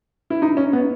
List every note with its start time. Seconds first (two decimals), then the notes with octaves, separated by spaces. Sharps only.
0.30 E4
0.42 D#4
0.57 C#4
0.73 B3